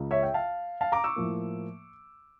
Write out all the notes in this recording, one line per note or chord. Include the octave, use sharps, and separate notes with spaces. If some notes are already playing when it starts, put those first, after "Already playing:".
Already playing: C#2 C#3
C#5 E5
E5 G5
F5 A5
F5 A5
A#5 D6
C#6 E6
A2 F3 A#3